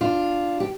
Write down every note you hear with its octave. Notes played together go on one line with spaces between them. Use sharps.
D4 F4
G4